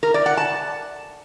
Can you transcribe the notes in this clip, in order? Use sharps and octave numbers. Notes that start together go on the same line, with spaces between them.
A#4
D5
F#5
A5